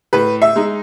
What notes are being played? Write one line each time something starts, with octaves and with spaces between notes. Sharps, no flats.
A2 B4
E5
G#3 D#4